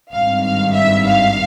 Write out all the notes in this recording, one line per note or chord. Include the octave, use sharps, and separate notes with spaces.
G#1 G2 D#3 F5
F5
E5
F5